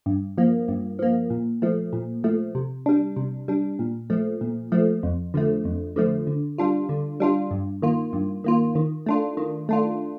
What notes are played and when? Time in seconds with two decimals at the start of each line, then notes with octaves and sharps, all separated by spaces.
0.06 G2
0.38 F3 A#3
0.68 G2
0.99 F3 A#3
1.30 A#2
1.62 F3 A3
1.93 A#2
2.24 F3 A3
2.55 C3
2.86 G3 D4
3.17 C3
3.48 G3 D4
3.79 A#2
4.10 F3 A3
4.41 A#2
4.72 F3 A3
5.03 F2
5.34 D3 F3 A3
5.65 F2
5.96 D3 F3 A3
6.27 D3
6.58 G3 D4 F4
6.89 D3
7.20 G3 D4 F4
7.51 G2
7.82 D#3 A#3 F4
8.13 G2
8.44 D#3 A#3 F4
8.75 D#3
9.06 A3 D4 F4
9.37 D#3
9.69 A3 D4 F4